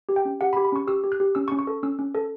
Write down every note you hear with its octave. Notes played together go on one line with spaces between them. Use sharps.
G4
G5
C#4
G4 F#5
B5
G4
B5
C#4 C#6
G4 E6
G4
F#6
G4
C#4 E6
C#6
C#4
C#6
A4
C#4 E6
C#4
A4